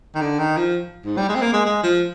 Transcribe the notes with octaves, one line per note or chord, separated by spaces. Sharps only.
D#3
D3
D#3
F3
G#2
G3
G#3
C4
A#3
G#3
G#3
F3